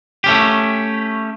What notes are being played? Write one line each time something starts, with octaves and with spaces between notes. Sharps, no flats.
A3 C#4 G4